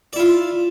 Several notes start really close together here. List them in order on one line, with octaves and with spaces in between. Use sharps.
D5 E4 F4